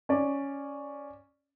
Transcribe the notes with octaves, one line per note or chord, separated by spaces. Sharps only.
C#4 D5